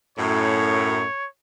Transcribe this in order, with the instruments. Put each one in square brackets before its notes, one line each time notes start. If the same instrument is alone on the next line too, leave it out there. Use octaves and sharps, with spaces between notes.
[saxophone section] F#2 A2 [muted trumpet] C#5